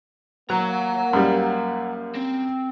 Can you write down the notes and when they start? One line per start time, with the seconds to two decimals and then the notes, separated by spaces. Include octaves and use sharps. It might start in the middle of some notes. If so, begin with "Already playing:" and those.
0.50 F#3 A#3 F#5 A#5
1.13 F#2 G3
2.15 C4